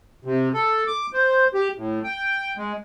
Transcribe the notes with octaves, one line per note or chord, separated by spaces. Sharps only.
C3
A4
D6
C5
G4
A2
G5
G#3